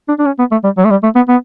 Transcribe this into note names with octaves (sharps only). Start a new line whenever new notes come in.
D4
D4
C#4
B3
A3
G3
F#3
A3
G3
A3
B3
B3